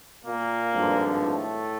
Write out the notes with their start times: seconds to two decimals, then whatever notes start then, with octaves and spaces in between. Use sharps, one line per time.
0.25 A#2 A#3
0.73 G#1 G2 D3 F3
1.20 A2 A3